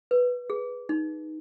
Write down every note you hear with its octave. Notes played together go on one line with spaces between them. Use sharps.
B4
G#4
D#4